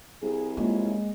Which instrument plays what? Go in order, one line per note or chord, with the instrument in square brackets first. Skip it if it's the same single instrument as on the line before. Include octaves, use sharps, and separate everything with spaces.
[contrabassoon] C2 [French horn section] G#4
[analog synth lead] G#3 [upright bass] A#3 [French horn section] C#4 E4 F4